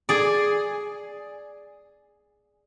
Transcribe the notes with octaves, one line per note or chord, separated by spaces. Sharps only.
G#4 D5